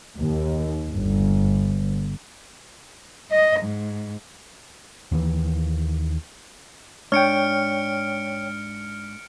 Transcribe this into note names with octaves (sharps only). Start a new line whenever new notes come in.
D#2
G1
D#5
G#2
D#2 E3
G#2 D4 C#5 G5 F6 C#7 D7